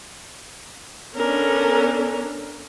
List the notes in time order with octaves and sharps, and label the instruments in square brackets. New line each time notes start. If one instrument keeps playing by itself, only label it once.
[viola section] B3 D4 A4 [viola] C#4 A#4